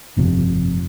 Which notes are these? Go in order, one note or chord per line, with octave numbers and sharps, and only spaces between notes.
G1 F2 C3